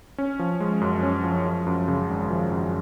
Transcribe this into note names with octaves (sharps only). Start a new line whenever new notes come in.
C#4
F3
G#3
F#2
C#4
F3
F3
F#2
C#3
G#1
F3
F#2